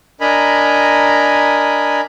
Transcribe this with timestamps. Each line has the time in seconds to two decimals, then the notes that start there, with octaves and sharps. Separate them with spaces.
0.21 D4 A#4 D#5 G#5 A#5 B5